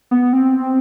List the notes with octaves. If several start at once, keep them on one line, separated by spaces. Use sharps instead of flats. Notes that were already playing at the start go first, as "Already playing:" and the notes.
B3
C4